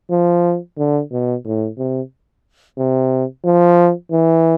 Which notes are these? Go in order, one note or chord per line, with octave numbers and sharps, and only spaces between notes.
F3
D3
B2
A2
C3
C3
F3
E3